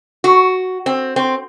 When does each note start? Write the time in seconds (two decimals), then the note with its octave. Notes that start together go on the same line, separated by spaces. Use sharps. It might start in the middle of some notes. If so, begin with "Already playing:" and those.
0.24 F#4
0.86 C4
1.16 C4